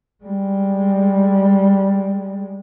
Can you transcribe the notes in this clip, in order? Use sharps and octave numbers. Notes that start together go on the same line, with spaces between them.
G3 G#3